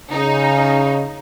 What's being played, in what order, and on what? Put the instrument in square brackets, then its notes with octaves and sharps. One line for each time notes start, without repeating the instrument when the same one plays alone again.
[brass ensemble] C#3 [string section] D#4